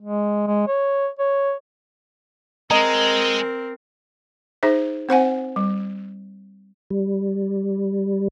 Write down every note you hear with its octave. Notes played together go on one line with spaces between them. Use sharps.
G#3
G#3
C#5
C#5
G#3 C4 A#4 D#5 A#5
D#4 G#4 C5 E5
C4 C5 F#5 G#5
G3
G3